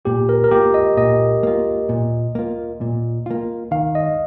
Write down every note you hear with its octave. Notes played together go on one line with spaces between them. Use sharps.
A#2 G4
A#4
A#4
A#3 F4 G4
D#5
A#2 D#5
A#3 F4
A#2
A#3 F4
A#2
A#3 F4
D#3 F5
D#5